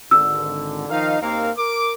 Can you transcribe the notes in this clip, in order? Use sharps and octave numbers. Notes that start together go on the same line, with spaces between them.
G#1 D3 E6
D#3 F3 D#4 F5
D#2 A#3 C4 A#4 F5
A#4 D6